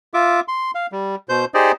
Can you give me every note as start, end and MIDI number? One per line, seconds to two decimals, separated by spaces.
0.14 0.40 65
0.14 0.40 76
0.14 0.40 86
0.48 0.71 84
0.75 0.87 77
0.92 1.16 55
1.29 1.45 47
1.29 1.45 72
1.29 1.45 91
1.54 1.72 63
1.54 1.72 67
1.54 1.72 68
1.54 1.72 72
1.54 1.72 74
1.54 1.72 75